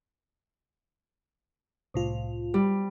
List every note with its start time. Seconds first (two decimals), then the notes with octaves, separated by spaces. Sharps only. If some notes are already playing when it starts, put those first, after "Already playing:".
1.94 C2 A2 F4
2.54 G3